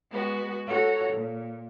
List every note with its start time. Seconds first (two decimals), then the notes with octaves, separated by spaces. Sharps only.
0.10 G#3 B3 F#4
0.67 F#4 A4 C#5 A#5
1.12 A#2